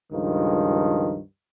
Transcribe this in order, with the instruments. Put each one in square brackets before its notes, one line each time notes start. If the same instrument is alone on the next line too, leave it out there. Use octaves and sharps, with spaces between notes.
[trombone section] C#2 G2 D#3 F3